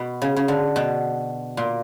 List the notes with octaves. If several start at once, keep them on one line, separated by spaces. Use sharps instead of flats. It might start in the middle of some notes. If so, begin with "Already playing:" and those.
Already playing: B2
C#3
C#3
D3
B2
A#2